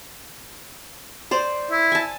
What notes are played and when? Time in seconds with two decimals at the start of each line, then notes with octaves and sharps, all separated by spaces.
1.31 C5 D5
1.71 E4
1.92 G#5 A5